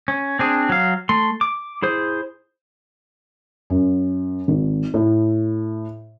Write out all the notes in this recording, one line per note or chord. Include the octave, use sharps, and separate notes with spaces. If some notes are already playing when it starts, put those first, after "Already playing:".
C#4
C4 D4 G#4
F#3 F5
A3 C6
D6
E4 G#4 C5
F#2
G#1
A2